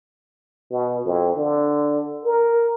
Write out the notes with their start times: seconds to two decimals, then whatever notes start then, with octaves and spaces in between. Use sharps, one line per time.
0.71 B2
1.06 F2
1.36 D3
2.25 A#4